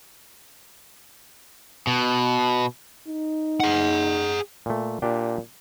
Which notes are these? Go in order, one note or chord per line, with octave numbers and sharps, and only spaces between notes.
B2
D#4
G#4 F#5
A#2 A3
A#2 D4 G4 G5